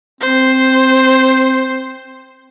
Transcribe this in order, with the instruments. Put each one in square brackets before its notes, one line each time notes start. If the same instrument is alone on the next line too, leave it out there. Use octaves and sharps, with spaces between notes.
[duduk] C4 [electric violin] C5